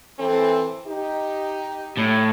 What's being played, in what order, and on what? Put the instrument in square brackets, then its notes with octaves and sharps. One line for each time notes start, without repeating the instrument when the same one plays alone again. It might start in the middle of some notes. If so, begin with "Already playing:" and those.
[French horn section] E3 C4 A4
D#4 G4
[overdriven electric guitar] A2